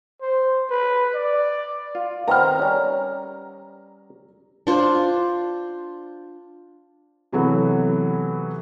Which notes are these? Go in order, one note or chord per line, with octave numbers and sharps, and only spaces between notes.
C5
B4
D5
F4
D#3 B3 C4 A#5 F6
G3 C#4
D4 F4 C5
C3 E3 F#3 A3 B3